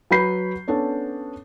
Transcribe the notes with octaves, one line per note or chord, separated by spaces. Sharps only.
F#3 F#4 B4 B5 G6 C7
B3 C#4 D4 A4 C#5